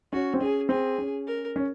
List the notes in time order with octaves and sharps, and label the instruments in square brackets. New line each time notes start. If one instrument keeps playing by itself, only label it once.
[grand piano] C#4 [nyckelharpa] F#4
[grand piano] C4
[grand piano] C#4 [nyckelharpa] G#4
[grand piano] C4 [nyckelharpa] G#4
[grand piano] C#4
[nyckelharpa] A#4
[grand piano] C#4